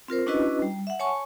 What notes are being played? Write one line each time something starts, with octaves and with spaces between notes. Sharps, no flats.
C4 F4 A#4 C5
C#4 D4 E4 F#4 B4 D#5
G3
E5 F#5
C#5 G#5 A5 C#6